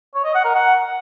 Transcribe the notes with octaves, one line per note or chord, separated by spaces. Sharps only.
C#5
D#5
F#5
A#4
F#5